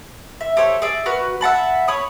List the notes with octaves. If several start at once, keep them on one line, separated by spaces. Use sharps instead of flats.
E5
G4 A4 C5 C#5
G#4 D5 E5
F#4 A#4 B4
E5 F#5 A5 B5
C#5 B5 D#6